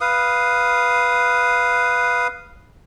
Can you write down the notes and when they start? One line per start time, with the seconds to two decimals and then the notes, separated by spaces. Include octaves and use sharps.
0.01 B4 F5 D#6